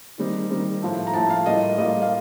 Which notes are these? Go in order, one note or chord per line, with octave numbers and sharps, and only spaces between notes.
D#3 G3 C4 D#4
D#3 G3 C4 D#4
A2 F3 A3
A#5
A2 F3 A3 A5
F5
A2 G3 A#3 F4 D#5
A2 G3 A#3 F4 D#5
F5